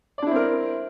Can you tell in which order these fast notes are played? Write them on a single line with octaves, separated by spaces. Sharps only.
D5 D4 E4 C4 A#4